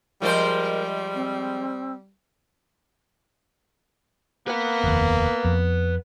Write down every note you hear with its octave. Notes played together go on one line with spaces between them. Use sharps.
F3 G3 G#3 A#4 C5
C4
A#3 B4 F#5
F1 D#2
F2